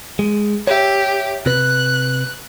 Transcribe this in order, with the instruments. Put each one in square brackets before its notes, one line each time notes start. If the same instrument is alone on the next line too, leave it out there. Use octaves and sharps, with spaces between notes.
[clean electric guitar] G#3
[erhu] G4 [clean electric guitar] C#5 E5
[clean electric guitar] C3 B4 [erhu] F#6